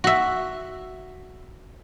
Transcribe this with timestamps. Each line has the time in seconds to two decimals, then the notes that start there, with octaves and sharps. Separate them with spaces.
0.04 F#4 E5